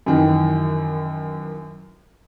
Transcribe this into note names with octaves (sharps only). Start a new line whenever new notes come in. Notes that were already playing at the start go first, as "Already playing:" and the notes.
F#2 D#3 E3